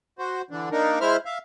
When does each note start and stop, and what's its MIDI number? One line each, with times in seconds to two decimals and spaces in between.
0.19 0.42 66
0.19 0.42 72
0.50 0.69 50
0.50 0.69 52
0.50 0.69 62
0.72 0.99 58
0.72 0.99 62
0.72 0.99 63
0.72 0.99 70
1.01 1.16 56
1.01 1.16 64
1.01 1.16 72
1.01 1.16 76
1.01 1.16 89
1.25 1.38 76
1.25 1.38 77